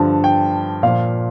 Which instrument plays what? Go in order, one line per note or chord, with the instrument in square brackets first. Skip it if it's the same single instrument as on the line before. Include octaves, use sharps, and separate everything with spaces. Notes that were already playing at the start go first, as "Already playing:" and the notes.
Already playing: [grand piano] G2 D3 F3 A5
G5
A#2 F3 F5